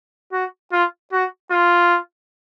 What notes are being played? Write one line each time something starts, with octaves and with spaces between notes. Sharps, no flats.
F#4
F4
F#4
F4